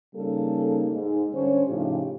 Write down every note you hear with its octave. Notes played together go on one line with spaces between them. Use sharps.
C#3 G3 A#3 D#4 A4
G#2
G2 D3 C#4 D4 C5 C#5
A2 C#3 F3 D#4 G4